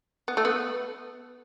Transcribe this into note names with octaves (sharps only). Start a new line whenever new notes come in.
B3
A3
B3